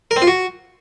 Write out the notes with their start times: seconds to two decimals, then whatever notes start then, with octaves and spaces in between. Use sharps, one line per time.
0.11 A#4
0.16 C4
0.22 F4
0.27 F#4